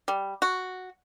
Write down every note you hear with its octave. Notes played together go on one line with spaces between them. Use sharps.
G3
F#4